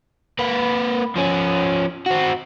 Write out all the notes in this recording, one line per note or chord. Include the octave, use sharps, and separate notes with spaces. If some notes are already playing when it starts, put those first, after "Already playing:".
A#3 B4
F3 C#4
C4 F#4